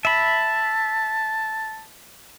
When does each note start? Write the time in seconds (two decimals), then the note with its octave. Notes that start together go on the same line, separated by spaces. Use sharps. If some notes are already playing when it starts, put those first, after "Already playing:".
0.05 E5 A5 B5